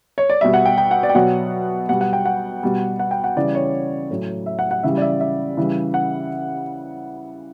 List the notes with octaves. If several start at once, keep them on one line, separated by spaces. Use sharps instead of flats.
C#5
D5
B2 G3 E5
F#5
G5
G5
F#5
D5
G5
B2 F#3 F#5
B2 G3 F#5
F#5
G5
F#5
B2 G3
F#5
G5
F#5
C#3 E3 G3 D5
C#5
A2 F#3
E5
F#5
F#5
C#3 E3 G3 E5
D5
E5
E5
C#3 E3 G3
F#5